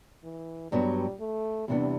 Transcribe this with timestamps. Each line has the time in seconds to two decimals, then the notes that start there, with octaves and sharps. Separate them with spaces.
0.24 E3
0.71 G2 F#3 G3 B3
1.20 A3
1.68 E2 C3 E3 G3 B3 D4